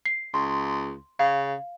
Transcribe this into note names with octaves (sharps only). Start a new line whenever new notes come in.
C7
C#2 C6
C#3 F5